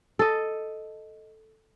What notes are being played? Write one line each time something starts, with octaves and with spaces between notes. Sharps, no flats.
A4 D#5